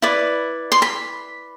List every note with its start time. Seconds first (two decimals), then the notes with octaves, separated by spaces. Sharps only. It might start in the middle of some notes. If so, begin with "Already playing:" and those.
0.02 E4 B4 D5
0.72 C6
0.82 B5